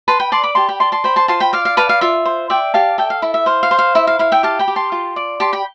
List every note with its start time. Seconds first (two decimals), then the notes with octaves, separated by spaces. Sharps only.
0.08 B4 A5 C6
0.20 G5 B5
0.32 D5 A5 C6
0.43 B5 D6
0.55 G4 A5 C6
0.69 G5 B5
0.80 D5 A5 C6
0.92 A5 C6
1.04 C5 G5 B5
1.16 A5 C6
1.28 F4 A5 C6
1.40 G5 B5
1.53 D5 F5
1.65 F5
1.77 B4 F5 A5
1.89 F5
2.01 F4 E5
2.25 C5
2.50 D5 E5 G5
2.74 G4 F5 A5
2.98 A4 E5 G5
3.10 F5
3.22 E4 E5
3.34 E5
3.46 C5 F5
3.63 F5
3.71 C5
3.79 F5
3.95 E4 E5
4.07 F5
4.19 E4 F5
4.32 E5 G5
4.43 G4 F5 A5
4.59 G5 B5
4.68 G4
4.76 A5 C6
4.92 F4
5.16 D5
5.40 G4 A5 C6
5.53 G5 B5